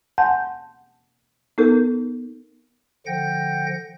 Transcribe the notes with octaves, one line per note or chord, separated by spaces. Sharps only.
F#5 G#5 A5 C6 G6
B3 D#4 A4 A#4
D3 F3 F#5 G5 G6 A#6